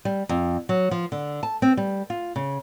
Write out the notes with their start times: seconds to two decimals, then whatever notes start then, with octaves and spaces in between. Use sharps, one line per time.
0.05 G3
0.29 F2
0.69 F#3
0.91 F3
1.12 D3
1.43 A5
1.62 C4
1.77 G3
2.10 F4
2.36 C#3